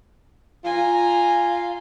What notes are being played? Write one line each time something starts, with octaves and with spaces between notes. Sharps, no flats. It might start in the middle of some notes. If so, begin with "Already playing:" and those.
F4 G#5 A#5